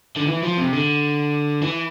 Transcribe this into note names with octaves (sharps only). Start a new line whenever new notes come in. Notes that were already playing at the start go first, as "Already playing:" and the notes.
D3
E3
F3
C3
D3
E3